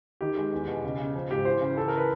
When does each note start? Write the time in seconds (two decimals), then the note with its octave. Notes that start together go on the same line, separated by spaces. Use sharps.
0.21 D#3 G4
0.37 G#3
0.53 E2
0.68 B2
0.84 C#3
0.98 C#3
1.15 F3
1.30 G#2 G4
1.45 E3 C5
1.61 C#3
1.76 E3 A4
1.88 A#4
1.98 B4